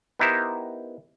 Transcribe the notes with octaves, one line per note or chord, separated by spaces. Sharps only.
B3 D#4 E4 G4 A#4 C5